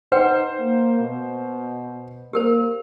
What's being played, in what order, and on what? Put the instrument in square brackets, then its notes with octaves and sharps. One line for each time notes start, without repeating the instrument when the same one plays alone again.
[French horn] D#4 [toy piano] B4 F#5 G5 [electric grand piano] C5
[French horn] A#3
B2
[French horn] A#3 [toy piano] G4 A#4 C5